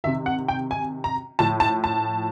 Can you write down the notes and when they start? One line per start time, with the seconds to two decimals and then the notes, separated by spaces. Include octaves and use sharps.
0.04 D#3 E5
0.07 C3
0.26 F#5
0.48 G5
0.71 G#5
1.04 A#5
1.39 A2 F3 A5
1.60 A5
1.84 A5